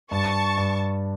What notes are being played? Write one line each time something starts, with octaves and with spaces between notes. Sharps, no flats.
G2 A5 C#6
G2